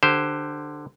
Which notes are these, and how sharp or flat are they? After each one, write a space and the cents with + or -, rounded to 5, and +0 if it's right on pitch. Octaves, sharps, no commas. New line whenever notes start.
D3 +15 G4 +0 C5 +0